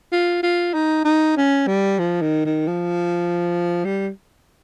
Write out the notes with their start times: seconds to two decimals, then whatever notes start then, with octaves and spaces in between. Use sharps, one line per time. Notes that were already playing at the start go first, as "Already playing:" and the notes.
0.12 F4
0.43 F4
0.74 D#4
1.04 D#4
1.37 C#4
1.67 G3
1.99 F3
2.22 D#3
2.46 D#3
2.68 F3
3.85 G3